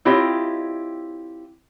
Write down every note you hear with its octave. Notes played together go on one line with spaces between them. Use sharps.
C4 E4 F4 G4 C#5 D#5